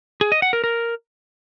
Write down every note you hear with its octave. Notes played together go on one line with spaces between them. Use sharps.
G#4
D#5
F#5
A#4
A#4